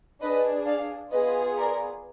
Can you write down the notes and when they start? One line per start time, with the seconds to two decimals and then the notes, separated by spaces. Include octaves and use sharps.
0.21 D4 G#4 B4 D#5
0.66 D5 F5
1.12 B3 F4 G#4 B4 D#5
1.58 A#4 D5